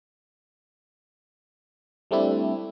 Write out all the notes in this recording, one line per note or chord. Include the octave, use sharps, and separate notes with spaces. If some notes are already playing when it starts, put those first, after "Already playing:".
G3 A3 C4 D4 E4